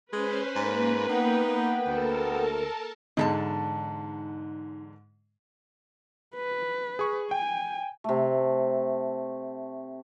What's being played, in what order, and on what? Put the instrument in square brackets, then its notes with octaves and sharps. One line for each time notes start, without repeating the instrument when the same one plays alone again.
[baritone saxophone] G#3 [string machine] C#4 C5 [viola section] B4
[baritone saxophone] G#2 [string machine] A#3
[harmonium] B3 G5 [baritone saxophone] D#4
[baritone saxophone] D2 [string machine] A4 A#4 A5
[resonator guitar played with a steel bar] E2 E4 A5 [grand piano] G#2 D3 G#3 [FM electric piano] D#4
[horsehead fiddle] B4
[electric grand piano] G#4 C#6
[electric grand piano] G5 [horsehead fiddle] G#5
[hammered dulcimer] C3 A3